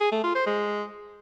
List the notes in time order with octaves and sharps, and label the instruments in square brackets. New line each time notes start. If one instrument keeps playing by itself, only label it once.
[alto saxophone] G#4
A3
F4
C5
G#3